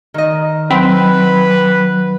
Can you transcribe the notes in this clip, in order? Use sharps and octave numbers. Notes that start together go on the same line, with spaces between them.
D#3 D#5
F#3 C4 B4 B5